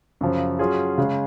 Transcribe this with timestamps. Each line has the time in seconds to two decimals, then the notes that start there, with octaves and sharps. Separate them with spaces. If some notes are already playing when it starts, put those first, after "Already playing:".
0.21 F#2 C#3 F3
0.59 F#3 C#4 F4 G#4
0.98 C#3 G#3 C#4